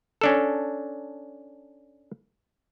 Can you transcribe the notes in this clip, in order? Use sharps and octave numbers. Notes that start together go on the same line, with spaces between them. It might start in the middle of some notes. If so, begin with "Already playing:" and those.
C#4 D4 A4